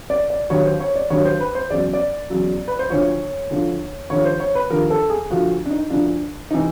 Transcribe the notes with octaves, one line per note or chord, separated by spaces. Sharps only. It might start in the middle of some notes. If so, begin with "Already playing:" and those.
D5
D5
D#2 D3 F#3 C#5
C5
C#5
D5
D#2 D3 F#3 C#5
C5
B4
C5
E2 C#3 F#3 D5
D5
E2 C#3 F#3
B4
C5
D2 D3 F3 C#5
D2 D3 F3
D#2 D3 F3 C#5
C5
C#5
B4
D#2 D3 F3 A#4
A4
G#4
D2 D3 F3 F#4
D4
D#4
D2 D3 F3 D4
C3 E3 D#4